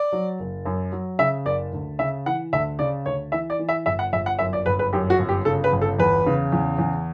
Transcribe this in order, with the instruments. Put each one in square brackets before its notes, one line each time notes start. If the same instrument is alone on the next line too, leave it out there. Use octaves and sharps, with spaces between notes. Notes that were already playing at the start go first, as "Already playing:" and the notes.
Already playing: [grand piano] D5
F#3
F#1
F#2
F#3
C#3 E5
F#1 D5
D2
C#3 E5
E3 F#5
D2 E5
C#3 D5
D2 C#5
E3 E5
D5
E3
E5
G1 E5
F#5
G1 E5
F#5
F#2 E5
D5
G1 B4
B4
F#2 G4
F#4
G1
G4
C#3 A4
B4
G1
A4
E2 B4
C#3
E2
E2